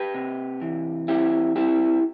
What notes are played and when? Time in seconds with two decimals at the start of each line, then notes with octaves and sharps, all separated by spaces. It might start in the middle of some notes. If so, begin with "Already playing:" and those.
Already playing: G4 B4
0.15 C3
0.61 E3
1.08 C4 E4 G4
1.56 C4 E4 G4